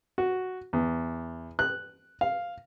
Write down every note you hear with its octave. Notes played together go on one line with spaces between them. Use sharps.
F#4
E2
F#6
F5